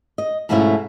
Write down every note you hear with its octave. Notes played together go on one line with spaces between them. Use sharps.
D#5
G#2 B2 F3 A3 C#4 E4